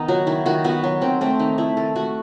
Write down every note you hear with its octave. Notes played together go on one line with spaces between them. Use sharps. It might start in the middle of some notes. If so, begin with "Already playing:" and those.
Already playing: D#3 B3 D#4
F#3 F#4
D#3 E4
D#3 F#4
B3 F#4
F#3
D#3 C4
A3 C4
D#3 D#4
A3 E4
D#3 A4
A3 F#4